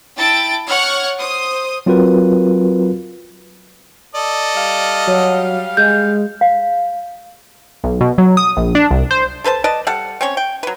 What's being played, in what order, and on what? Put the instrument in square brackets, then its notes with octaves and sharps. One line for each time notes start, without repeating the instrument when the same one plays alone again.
[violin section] E4 G5 A5 A6 D7
C#5 F#5 C#6 F6 G#6
C5 D#6
[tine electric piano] F#3 C4 F4 F#4 A#4 B4
[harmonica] A4 D5 D#5
[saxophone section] G3 F5
[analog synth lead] F#3
[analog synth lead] G#3 [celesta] G6
[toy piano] F5
[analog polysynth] B1
B2
F#3
D#6
A#1
D4
C2
C5
[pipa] A4 B4 C5 A5
B4 D5 D#5 A5
G3 A4 F#5
C4 C#4 C#5
G5
F#3 B4